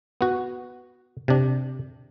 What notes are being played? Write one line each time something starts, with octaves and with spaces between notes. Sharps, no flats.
B3 F#4
C3 D4